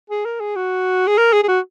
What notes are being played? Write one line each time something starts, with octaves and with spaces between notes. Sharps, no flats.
G#4
A#4
G#4
F#4
G#4
A#4
G#4
G#4
F#4